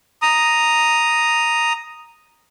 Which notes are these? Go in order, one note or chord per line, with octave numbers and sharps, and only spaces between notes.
A#5 D#6